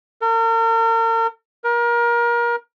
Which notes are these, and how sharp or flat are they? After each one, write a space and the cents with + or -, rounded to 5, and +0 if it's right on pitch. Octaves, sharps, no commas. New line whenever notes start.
A#4 -40
A#4 +30